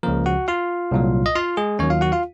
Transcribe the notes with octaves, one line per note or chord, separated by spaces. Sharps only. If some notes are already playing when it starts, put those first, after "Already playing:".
C#2 C#3 F3 A#3 A#4
F#4 F#5
F4 F5
C2 A#2 F#3
D#5
F4 F5
G#3 G#4
D#2 D#3 F#3 C#4 C#5
F4 F5
F#4 F#5
F4 F5